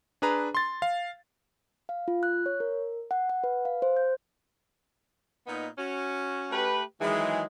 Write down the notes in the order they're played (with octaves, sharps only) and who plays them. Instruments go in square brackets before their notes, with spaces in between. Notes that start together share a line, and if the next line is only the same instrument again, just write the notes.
[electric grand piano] D4 G#4 B4 A#5
C6 A6
F5
[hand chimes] F5
F4
F#6
C#5
A#4
F#5
F#5
B4
F5
C5
G6
[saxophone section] A#2 B3 D#4
C#4 F#4
[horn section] A3 G4 B4
[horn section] D#3 F#3 G#3 [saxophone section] E3 G#4